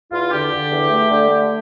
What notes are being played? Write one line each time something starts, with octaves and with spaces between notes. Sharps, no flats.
E2 F4
D3 G4
D3
E2
A3
D3
A3